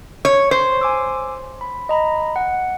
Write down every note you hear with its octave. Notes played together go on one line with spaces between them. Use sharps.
C#5
C5
G#5 D6 E6
B5
D#5 A#5 B5
F#5